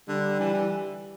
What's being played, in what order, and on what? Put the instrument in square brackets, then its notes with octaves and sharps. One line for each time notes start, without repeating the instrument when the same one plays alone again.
[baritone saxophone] D3 [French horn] G3
[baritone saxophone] E3
E3